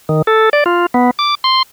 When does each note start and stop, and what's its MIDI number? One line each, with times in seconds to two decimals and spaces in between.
0.09 0.22 51
0.27 0.49 69
0.53 0.64 74
0.66 0.86 65
0.94 1.11 59
1.19 1.35 86
1.44 1.62 84